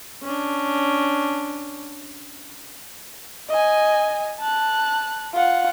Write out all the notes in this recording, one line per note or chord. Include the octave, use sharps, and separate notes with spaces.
C#4 D4
D#5 G#5
A5 F#6
F4 F#5